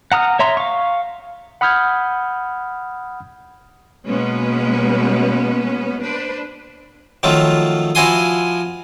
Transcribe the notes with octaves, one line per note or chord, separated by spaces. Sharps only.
F#5 A#5 D#6 F6
C#5 E5 A#5 C6
F5 C#6
F#5 B5 D#6 F6 G6 G#6
B2 G#3 A#3 B3 C#4 B4
D4 B4 C5
D#3 F3 F#3 A3 F4
F3 E4 F#4 G#5 C6 D#6